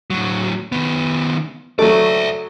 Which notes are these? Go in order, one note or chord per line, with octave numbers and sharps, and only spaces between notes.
A2 F#3
D#3 B3
F#3 A3 D5 E5